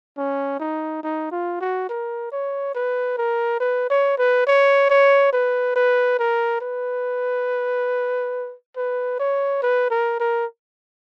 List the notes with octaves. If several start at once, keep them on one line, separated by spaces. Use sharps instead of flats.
C#4
D#4
D#4
F4
F#4
A#4
C#5
B4
A#4
B4
C#5
B4
C#5
C#5
B4
B4
A#4
B4
B4
C#5
B4
A#4
A#4